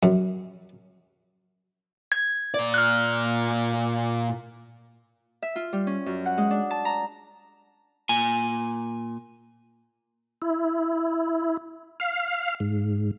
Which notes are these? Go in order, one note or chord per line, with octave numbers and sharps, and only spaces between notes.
F#2
G#6
A#2 D5
F6 F#6
E5
F4
G3
C#4
F#2
F#5
G#3
D4
A5
A#5
A#2 G#5
E4
F5
G#2